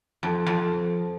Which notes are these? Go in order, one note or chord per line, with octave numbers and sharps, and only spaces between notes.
F2
F2